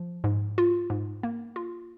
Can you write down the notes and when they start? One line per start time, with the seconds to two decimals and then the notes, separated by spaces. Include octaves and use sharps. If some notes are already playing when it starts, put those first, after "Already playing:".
Already playing: F3
0.24 G#2
0.58 F4
0.90 G#2
1.23 A#3
1.56 F4